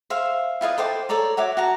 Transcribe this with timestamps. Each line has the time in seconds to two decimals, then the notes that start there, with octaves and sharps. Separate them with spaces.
0.10 C5 E5 F5
0.61 E4 F4 B4 D#5
0.78 A4 C5 G5 D6
1.09 A4 C#5 D5 A#5
1.37 F#4 C#5 E5 D6
1.57 F#4 A5 A#5